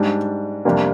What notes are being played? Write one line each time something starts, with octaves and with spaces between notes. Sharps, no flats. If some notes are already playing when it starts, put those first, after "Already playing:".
Already playing: G#2 G3 D4
F2 C3 G3 A#3 D4